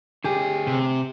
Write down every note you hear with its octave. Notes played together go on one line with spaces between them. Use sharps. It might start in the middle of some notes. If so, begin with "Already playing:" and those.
D2 G4 G#4
C3